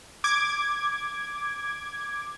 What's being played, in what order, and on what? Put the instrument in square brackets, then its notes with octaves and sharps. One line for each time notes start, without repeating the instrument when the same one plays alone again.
[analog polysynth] D6 G#6